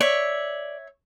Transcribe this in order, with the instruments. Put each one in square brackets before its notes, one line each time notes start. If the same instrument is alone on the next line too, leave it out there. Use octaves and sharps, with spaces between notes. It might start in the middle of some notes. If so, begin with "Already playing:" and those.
[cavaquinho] C#5 E5 [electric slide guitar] D5